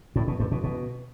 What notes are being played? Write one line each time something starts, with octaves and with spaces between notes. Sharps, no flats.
A2
B2
G2
B2
B2